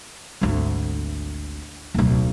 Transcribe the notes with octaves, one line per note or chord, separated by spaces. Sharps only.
G#1 D2
D1 B1